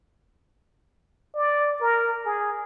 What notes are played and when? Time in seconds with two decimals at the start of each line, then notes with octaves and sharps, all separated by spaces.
1.35 D5
1.81 A#4
2.25 G#4